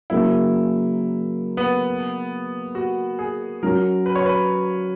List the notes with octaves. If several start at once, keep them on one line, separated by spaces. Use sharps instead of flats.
C#3 F#3 A#3 E4
B3
F#4
G#4
F#3 C#4 F#4 A#4
B4
C#5
B4